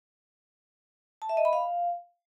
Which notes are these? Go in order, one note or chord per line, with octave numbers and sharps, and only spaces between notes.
A5
E5
D#5
B5
F5